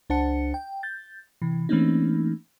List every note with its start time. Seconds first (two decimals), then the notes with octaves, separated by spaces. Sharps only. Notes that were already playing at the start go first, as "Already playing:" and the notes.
0.10 C#2 D4 C5 F#5 A5 C#7
0.54 G5
0.83 G6 A6
1.42 C3 E3
1.69 E3 A3 A#3 C4 C#4 D#4